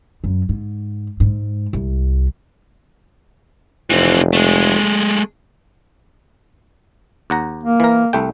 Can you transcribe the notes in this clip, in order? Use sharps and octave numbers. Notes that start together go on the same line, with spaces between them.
F#2
G#2
G#2
C2
F1 E3 C4
G#3 A3
D#2 F#5 A#5
A#3
E3 A#4
C2 A3 G5